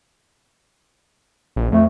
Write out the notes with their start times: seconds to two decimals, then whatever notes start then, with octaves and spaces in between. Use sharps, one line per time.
1.56 A#1
1.72 F2 A3